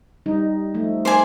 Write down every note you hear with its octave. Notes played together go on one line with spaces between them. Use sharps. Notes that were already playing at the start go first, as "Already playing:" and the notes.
G3 D#4
F3 A3
C5 D5 G#5